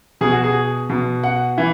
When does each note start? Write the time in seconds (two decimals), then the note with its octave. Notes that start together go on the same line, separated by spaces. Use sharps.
0.21 B2 G#4
0.32 F#4
0.44 G#4
0.89 B2
1.23 F#5
1.58 E3